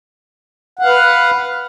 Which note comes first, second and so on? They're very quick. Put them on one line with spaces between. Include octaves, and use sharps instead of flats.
F#5 F5 B4